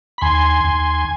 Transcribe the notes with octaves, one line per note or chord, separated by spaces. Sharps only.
B5
D#2 G#5 C6
D#2